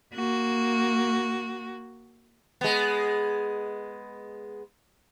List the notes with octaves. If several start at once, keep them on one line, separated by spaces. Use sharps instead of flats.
A#3 F#4
G#3 B3